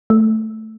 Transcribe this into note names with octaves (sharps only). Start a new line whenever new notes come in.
A3